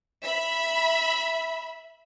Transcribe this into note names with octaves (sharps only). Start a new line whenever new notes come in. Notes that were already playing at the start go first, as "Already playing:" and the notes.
E5 B5